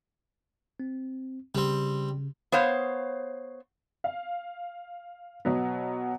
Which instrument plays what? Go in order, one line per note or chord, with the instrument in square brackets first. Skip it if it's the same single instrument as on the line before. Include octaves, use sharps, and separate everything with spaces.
[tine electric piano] C4
[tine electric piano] C#3 [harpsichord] G3 C4
[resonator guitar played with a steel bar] B3 C5 C#5 F5
[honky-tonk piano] F5
B2 F#3 B3